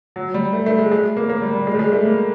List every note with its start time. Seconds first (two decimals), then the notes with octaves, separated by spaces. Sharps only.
0.16 F#3
0.34 G3
0.53 A3
0.66 A3
0.79 G#3
0.92 G#3
1.17 A#3
1.30 A#3
1.42 G3
1.55 G3
1.67 G#3
1.75 G3
1.79 G#3
1.92 A3
2.05 A#3